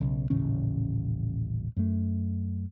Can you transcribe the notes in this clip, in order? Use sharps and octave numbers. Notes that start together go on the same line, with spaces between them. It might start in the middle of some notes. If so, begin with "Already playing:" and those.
B1 C#3
D#1 A1 C#3 C#4
F#2 A3